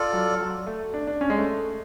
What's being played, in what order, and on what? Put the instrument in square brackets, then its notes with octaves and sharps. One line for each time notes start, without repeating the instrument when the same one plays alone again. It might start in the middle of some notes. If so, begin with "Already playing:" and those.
Already playing: [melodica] F4 A4 D5
[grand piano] F#3
F#3
A3
D4
D4
C#4
G#3
A3